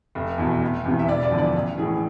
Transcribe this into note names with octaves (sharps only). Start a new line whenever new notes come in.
F1
E2 B2
F1
E2 C3 E3
E5
E1 D5
D5
E2 D3 F3
D5
A1
A2 E3 G#4